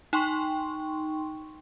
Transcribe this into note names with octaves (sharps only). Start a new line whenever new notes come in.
D#4 G5 C6 C#6